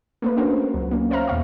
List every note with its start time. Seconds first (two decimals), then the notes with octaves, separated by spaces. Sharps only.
0.22 A3 A#3 B4
0.37 C#4 D4 F#4 A#4 C5
0.74 C#2 F#3
0.91 A#3 C#4
1.11 C5 C#5 E5 F5 A#5 F6
1.27 E2 B2 F5 C#6